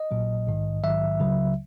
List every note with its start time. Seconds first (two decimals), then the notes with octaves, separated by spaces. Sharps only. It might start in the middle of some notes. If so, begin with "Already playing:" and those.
Already playing: D#5
0.11 A#1 A#2 F#3
0.46 A#1 G#2 D#3
0.84 A#1 G#2 D#3 F#3 E5
1.20 C#2 C#3 F#3